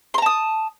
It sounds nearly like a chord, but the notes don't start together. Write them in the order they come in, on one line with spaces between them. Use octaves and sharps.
C6 A#5 A5 D#6